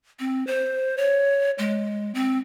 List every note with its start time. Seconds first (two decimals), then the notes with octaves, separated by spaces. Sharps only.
0.19 C4
0.47 C5
0.97 C#5
1.58 G#3
2.14 C4